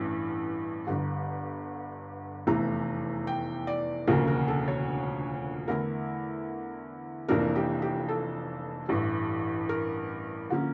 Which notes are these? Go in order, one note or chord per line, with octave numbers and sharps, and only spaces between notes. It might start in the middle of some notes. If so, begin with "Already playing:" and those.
Already playing: A1 G2 E3 A3 C#4
G1 G2 D3
F1 E2 E3 A3 A#5
G5
D5
E1 D2 C#3 F3 A#3 A#4
A#4
A4
C#5
E2 D3 A3 E4 A#4
F1 F2 E3 A#3 D4 A#4
G4
G4
A4
A1 G2 E3
A#4
D3 F3 A#3 C#4